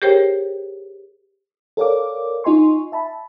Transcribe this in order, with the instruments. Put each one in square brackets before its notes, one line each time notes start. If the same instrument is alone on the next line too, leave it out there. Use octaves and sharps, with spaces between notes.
[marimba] G4 G#4 A#4 C5 C#5 G5
[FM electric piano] A4 A#4 C#5 D5 F5 D6
D#4 F4 D#5 G#5 C6 C#6
E5 A5 B5